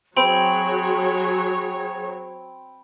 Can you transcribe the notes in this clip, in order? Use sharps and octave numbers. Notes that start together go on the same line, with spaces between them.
F#3 C4 G#4 C#5 B5 D7 F#7